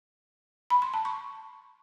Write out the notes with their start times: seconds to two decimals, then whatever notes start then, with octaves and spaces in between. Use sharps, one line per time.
0.70 B5
0.82 C6
0.94 A5
1.05 C#6